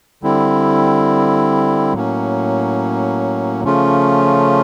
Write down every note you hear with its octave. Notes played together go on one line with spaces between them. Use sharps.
D3 G3 C4 E4
A2 F#3 A#3 C#4
C#3 F3 A3 C#4 F4